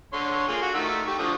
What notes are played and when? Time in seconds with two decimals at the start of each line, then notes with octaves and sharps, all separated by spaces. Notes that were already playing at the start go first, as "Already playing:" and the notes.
0.13 D3 C#5 C6
0.48 A#3 F4 G#4
0.62 F#4
0.74 D#3 A3 E6
1.07 G4 C#6
1.19 D3 F3 D#6